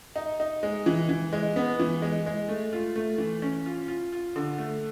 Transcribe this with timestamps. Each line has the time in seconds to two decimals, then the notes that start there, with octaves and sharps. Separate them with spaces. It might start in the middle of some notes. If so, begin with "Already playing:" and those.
0.16 D#4
0.40 D#4
0.63 G#3
0.86 E3
1.09 E3
1.33 G#3
1.56 B3
1.80 E3
2.02 G#3
2.26 G#3
2.49 A3
2.73 F4
2.96 A3
3.18 E3
3.42 C#4
3.66 F4
3.88 F4
4.12 F4
4.36 D3
4.58 A3